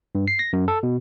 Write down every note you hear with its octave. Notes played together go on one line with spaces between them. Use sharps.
G2
C7
A#6
F#2
A4
B2